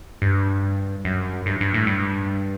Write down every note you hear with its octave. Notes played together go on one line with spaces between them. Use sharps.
G2
F#2
G2
G2
A2
G2